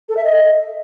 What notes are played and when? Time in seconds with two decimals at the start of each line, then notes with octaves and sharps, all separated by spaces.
0.09 A4
0.17 E5
0.24 D#5